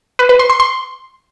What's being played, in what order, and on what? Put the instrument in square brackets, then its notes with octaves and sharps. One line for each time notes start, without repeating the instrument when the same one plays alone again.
[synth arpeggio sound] B4
B4
C6
C6
C6